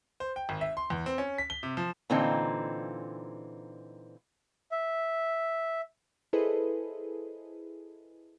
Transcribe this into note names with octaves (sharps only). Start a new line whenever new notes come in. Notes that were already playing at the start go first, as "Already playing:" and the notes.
C5
G5
G#1
E5
C6
E2
C4
C#4
B6
G7
C3
F3
A#2 D3 E3 C4 D#4 F4
E5
E4 G#4 A4 B4 C5 D#5